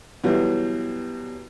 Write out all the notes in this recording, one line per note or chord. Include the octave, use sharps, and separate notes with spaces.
B2 E3 F#3 G3